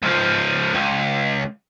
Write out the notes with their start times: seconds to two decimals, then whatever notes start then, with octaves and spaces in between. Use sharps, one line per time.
0.02 C#2 F3
0.75 C#2